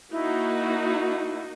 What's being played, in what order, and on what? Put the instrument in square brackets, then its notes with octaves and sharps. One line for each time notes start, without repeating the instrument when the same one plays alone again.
[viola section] A#3 D#4 F#4 [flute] E4